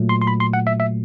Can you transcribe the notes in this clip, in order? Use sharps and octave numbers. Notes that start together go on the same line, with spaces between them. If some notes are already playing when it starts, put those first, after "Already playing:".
Already playing: A#2 F#3 A3
C6
C6
B5
C6
F#5
E5
E5